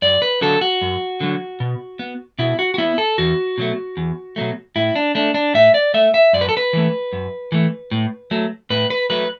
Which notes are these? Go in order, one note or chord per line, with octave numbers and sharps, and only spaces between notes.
F#2 D5
B4
D3 F#3 A4
F#4
F#2
D3 F#3
B2
B3
B2 E4
F#4
F#4
B3 E4
A4
E2 F#4
B2 F#3 A3
E2
B2 F#3 A3
A2 E4
D4
A3 D4
D4
A2 E5
D5
A3 E5
E5
F#2 D5
B4
A4
B4
E3 A3
F#2
E3 A3
A2
F#3 A3
A2 B4
B4
F#3 A3 B4